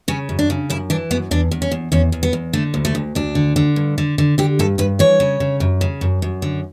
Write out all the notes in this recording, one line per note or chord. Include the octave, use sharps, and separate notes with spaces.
C#3 C#4
F#2
D4
C#3
F#2 E4
E3 D4
F#2 B3
E2 D4
E2
C#4
E2
E2 C#4
E2
B3
E2
D3 A3
D2
A3
D2
D2 D4
D3
D3
G2
D3
D3
D3 G4
G2 A4
G2 B4
E3 C#5
C#3
C#3
F#2
C#3
F#2
F#2
D3